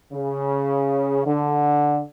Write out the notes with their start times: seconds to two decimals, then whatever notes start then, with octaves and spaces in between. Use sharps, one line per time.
0.11 C#3
1.26 D3